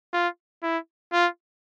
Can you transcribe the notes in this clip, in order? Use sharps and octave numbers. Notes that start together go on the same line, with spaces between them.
F4
E4
F4